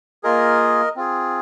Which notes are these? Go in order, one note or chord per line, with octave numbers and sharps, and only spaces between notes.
A#3 F4 G#4 A#4 D#5
C4 F4 G#4